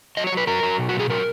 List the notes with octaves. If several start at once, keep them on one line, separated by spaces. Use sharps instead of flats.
F#3 D#5
C#5
F#3 B4
F#3 A#4
F#3
B2
F#4
F#3
G#4
F#3 A#4